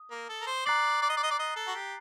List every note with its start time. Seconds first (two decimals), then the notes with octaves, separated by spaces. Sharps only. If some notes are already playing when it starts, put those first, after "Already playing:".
Already playing: D#6
0.11 A#3
0.29 A4
0.42 A#4
0.47 C5
0.66 D5 A#5 F#6 A6 C7 F#7
1.02 D5
1.10 D#5
1.17 D5
1.23 D#5
1.31 D5
1.39 D#5
1.56 A4
1.67 F#4
1.75 G4